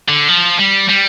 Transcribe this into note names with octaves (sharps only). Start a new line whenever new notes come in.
D3
F3
G3
G3